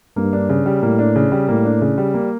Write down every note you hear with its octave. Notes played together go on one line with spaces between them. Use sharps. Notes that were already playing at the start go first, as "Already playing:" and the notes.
G2 A#3
D4
C#3
G3
A2 A#3
D4
C#3
G3
A2 A#3
D4
C#3
G3
A#3